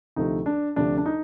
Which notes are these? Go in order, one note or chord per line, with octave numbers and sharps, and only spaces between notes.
D2 C3 F3 A3 D#4
D4
D2 C3 F3 A3 D4
D4
D#4